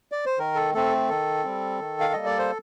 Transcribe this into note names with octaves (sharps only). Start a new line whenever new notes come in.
D5
C5
D#3 A#4
A4
A3 C4 A4
D#3 A4
G3 C4
D#3
F5
G3 A#3 D#5
D5
C5